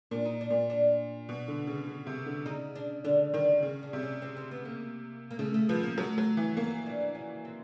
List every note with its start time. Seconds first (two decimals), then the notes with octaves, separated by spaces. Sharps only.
0.11 A#2 D4
0.25 D#4
0.41 D4
0.50 A#2
0.70 D4
1.29 B2
1.48 D3
1.67 C#3
1.87 C#3
2.07 C3
2.26 D3
2.46 C#3 D#4
2.75 D4
3.04 D3 D4
3.33 D#3 D4
3.63 C#3
3.83 D4
3.93 C3 D4
4.03 C#4
4.22 C4
4.37 C4
4.51 B3
4.65 A#3
5.31 A#3
5.39 C#3 A3
5.54 A3
5.69 F3 B3
5.83 A#3
5.97 F#3 A3
6.18 F#3
6.37 E3
6.56 A#3 C#4
6.86 D4
7.15 C#4
7.45 C4